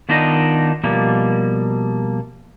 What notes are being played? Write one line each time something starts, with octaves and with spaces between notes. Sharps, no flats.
D#3 B3 D4 D#4 F4 D#5
B2 F3 G3 A#3